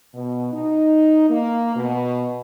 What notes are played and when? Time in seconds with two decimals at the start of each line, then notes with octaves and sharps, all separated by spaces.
0.15 B2
0.53 D#4
1.30 A#3
1.76 B2